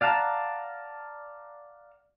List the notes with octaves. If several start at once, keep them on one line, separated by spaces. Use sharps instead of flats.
D5 F5 F#5 A5 A#5